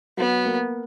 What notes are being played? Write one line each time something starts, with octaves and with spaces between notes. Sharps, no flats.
F#3 B3
A#3